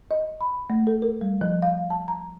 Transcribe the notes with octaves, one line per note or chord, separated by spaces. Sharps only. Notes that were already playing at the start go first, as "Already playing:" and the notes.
D#5
B5
A3
A4
A#4
G3
F3
F5
A5
A#5